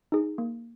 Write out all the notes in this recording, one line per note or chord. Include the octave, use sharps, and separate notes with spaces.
D#4 G#4
A#3